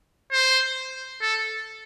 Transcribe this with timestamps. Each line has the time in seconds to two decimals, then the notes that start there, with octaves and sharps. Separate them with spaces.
0.32 C5
1.22 A4